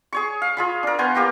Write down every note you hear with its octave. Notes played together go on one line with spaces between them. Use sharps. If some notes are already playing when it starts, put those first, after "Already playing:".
G#4 C#5 C#6
F5
F4 G#4 B5
D4 A#4
B3 C5 G#5 C#6
A#3 G4 A#5 C#6